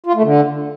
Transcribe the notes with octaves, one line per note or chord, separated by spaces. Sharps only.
F4
A3
D3